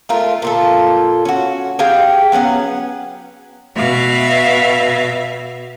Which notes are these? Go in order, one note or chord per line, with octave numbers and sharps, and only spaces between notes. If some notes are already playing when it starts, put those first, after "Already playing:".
A3 F4 A#4
A#2 F4 A4
C#4 F#4
G4 G#4 F5 G5
F#3 B3 C#4 F#5
B2 E5 F5